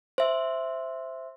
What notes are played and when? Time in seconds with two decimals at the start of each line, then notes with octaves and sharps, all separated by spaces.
0.18 C5 E5